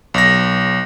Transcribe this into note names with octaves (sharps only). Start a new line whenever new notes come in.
B1 A#6